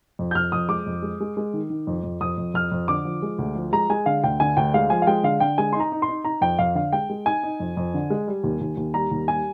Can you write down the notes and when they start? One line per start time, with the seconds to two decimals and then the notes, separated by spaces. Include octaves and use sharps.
0.19 F2
0.31 G6
0.35 F2 F6
0.52 F2 D#6
0.69 G#3 D6
0.86 F2
1.02 G#3
1.20 G#3
1.37 G#3
1.54 D#3
1.70 D#3
1.87 F2
2.03 F2
2.21 F2 D#6
2.37 F2
2.54 F2 F6
2.72 F2
2.88 D3 D6
3.05 F3
3.22 G#3
3.38 D2
3.55 F3
3.72 G#3 A#5
3.90 G#3 G#5
4.06 D3 F5
4.24 D2 G5
4.40 D3 G#5
4.57 D2 G5
4.74 G#3 F5
4.90 F3 G#5
5.02 F5
5.07 G#3 G5
5.23 D3 F5
5.40 D3 G5
5.58 G#3 G#5
5.73 D#4 C6
5.80 A#5
5.92 D#4
6.02 C6
6.09 D#4
6.25 D#4 A#5
6.41 F2 G5
6.59 F2 F5
6.75 D3 F5
6.92 G#3 G5
7.10 G#3
7.26 D#4 G#5
7.43 D#4
7.60 F2
7.77 F2
7.94 D3
8.10 G#3
8.27 G3
8.44 D#2
8.61 D#2
8.77 D#2
8.94 G3 A#5
9.11 D#2
9.28 G3 G#5